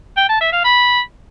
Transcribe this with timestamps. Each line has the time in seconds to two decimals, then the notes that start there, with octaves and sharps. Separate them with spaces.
0.17 G5
0.29 A5
0.41 E5
0.53 F5
0.65 B5